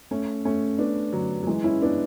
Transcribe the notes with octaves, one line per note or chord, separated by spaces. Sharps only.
A3 C#4
A3 C#4
B3 D4
D3 F#3
F#3
E3 G#3
C#4 E4
B3 D4